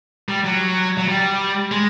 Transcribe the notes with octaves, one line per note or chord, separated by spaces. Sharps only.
G3
F#3
F#3
G3
G#3